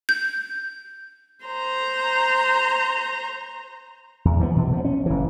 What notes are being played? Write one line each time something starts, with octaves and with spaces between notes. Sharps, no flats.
G6
C5 A#5
E2
E3 F3 A#3 B3
B2
F3 B3
C#4
F#1 E3